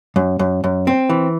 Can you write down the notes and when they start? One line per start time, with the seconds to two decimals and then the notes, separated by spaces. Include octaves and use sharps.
0.16 F#2
0.39 F#2
0.64 F#2
0.87 C4
1.10 E3